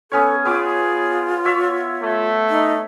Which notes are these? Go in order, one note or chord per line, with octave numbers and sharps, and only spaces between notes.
B3 C#4 A4 C#5
B3 F4 G#4 C#5 D6
C#5 E5
A3
D#4